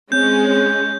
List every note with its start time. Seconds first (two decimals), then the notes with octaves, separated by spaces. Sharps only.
0.12 G#3 C4 C#4 G6